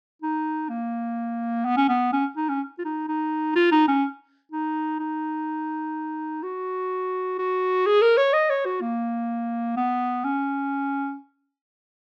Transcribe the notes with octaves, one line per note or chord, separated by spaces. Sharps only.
D#4
A#3
B3
C#4
B3
C#4
D#4
C#4
F4
D#4
D#4
F4
D#4
C#4
D#4
D#4
F#4
F#4
G#4
A#4
C#5
D#5
C#5
F#4
A#3
B3
C#4